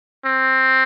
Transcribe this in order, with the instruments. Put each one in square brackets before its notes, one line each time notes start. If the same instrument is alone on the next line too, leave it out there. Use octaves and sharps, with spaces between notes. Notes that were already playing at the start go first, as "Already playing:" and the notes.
[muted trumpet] C4